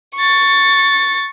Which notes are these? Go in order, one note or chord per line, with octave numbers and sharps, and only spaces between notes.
C#6 A6